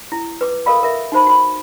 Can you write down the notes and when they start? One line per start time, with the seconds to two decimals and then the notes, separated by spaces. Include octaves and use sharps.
0.12 E4
0.41 B4 D6
0.66 A4 A#4 D#5 F5 B5
0.83 A#4 E5
1.12 D#4 F#4 C5 B5
1.27 F#4 B5